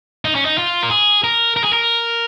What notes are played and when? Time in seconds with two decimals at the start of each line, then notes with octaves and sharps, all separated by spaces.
0.25 D#4
0.35 C#4
0.45 D#4
0.58 F4
0.83 A#4
0.91 G#4
1.24 A#4
1.57 A#4
1.64 G#4
1.73 A#4